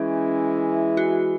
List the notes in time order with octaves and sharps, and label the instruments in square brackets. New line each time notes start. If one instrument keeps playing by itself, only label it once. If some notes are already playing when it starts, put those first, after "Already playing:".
Already playing: [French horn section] E3 G#3 E4 [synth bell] C#4
[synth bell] F#4